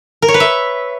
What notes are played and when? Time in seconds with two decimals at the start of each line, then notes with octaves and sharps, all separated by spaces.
0.22 A#4
0.28 C#5
0.34 B4
0.40 E5